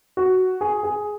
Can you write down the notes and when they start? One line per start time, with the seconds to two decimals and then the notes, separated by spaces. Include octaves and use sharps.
0.17 F#4
0.61 G#4
0.83 G#4